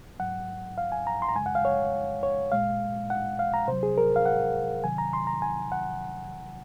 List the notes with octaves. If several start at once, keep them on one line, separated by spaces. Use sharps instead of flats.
G#2 F#3 F#5
F5
G#5
A#5
C6
A#5
F#2 C#3 G#3 G#5
F#5
F5
C#5
C#5
A#2 G#3 F5
F#5
F5
A#5
C3 F#3 C5
G#4
A#4
F5
F#5
C3 D#3 F#3 G#5
A#5
C6
A#5
G#5
F#5